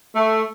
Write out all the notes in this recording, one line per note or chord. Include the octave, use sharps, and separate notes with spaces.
A3